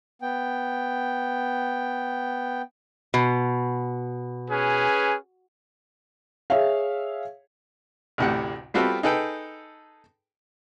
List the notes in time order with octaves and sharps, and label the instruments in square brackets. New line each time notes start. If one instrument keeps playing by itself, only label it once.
[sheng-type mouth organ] B3 G5
[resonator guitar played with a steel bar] B2
[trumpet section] C#4 G#4 B4
[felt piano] G#4 C#5 E5 F5
[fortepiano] A1 D2 A2 C3 F#5
G3 B3 C4 F4 F#4 A4
D#4 G#4 A4 B4 G5